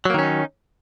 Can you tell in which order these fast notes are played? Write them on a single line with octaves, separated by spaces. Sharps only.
F#3 A#3 D#3 C#4 D#4